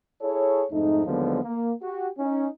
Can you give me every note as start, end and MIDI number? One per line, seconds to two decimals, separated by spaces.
0.21 0.63 64
0.21 0.63 68
0.21 0.63 69
0.21 0.63 73
0.71 1.03 41
0.71 1.03 44
0.71 1.03 57
0.71 1.03 63
1.05 1.39 39
1.05 1.39 50
1.05 1.39 53
1.05 1.39 54
1.05 1.39 56
1.05 1.39 59
1.44 1.71 58
1.82 2.07 66
1.82 2.07 67
2.18 2.47 61
2.18 2.47 63